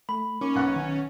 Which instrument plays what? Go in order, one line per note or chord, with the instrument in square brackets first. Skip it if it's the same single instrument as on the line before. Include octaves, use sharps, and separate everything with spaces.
[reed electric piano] A3 [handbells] B5
[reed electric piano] A#3 D#4 D6 [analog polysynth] C#4
[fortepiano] B1 F#5
[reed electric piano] D#3